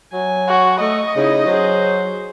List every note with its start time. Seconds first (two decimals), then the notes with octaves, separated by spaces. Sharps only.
0.13 F#3 G#5
0.49 F#4
0.80 A3 D#5 C#6
1.16 C#3 D#4 E4
1.45 F#3 G#4 C5